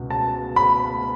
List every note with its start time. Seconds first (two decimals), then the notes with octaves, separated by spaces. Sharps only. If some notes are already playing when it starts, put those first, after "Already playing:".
Already playing: C#2 B2
0.10 A5
0.56 B5